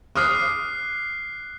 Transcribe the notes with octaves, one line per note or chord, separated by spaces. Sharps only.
D6 D#6 F6 F#6 C7